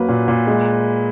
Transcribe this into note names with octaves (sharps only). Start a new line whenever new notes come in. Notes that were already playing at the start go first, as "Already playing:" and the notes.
Already playing: F#2 F#3 A#3 B4
A#2
A#2
G#3